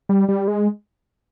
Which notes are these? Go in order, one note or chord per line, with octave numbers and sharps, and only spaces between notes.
G3
G3
G#3